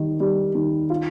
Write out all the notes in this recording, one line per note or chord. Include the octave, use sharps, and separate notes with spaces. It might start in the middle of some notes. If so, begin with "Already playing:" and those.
Already playing: D#3 G3
G3
D#3
F4